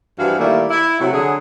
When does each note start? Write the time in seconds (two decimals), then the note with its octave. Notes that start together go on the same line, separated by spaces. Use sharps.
0.19 G2 E3 F3 F#4 F5
0.40 D#3 G3 A3 A#3 E4
0.71 E4
1.00 C3 F#3 A3 E4 F#4
1.14 D3 F#3 G#4